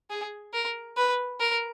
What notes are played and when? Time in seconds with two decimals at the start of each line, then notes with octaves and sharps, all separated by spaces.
0.10 G#4
0.53 A#4
0.97 B4
1.40 A#4